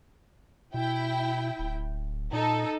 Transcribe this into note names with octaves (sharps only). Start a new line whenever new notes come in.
B2 E4 G5
D1
A#2 D#4 A4